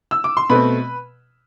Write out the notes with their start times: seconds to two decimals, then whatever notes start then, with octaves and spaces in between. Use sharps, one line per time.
0.11 E6
0.24 D6
0.37 C6
0.50 B2 A3 C4 B4 B5